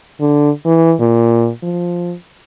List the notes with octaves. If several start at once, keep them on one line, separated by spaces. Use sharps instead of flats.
D3
E3
A#2
F3